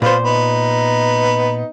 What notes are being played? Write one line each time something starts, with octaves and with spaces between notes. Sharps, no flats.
A#2 B3 F4 C5
B3 D#4